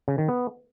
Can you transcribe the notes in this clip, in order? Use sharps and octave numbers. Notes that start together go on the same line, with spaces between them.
C#3
D#3
B3